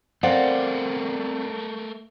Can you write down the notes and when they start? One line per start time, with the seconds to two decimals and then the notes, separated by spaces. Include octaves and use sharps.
0.23 A3 C4 A#4 D5 F5 F#5